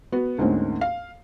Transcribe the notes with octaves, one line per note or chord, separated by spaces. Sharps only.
B3 F#4
D2 G#2 A#3 C4 C#4
F5